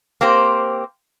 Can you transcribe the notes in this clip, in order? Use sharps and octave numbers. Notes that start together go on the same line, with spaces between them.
A#3 C4 G4 C5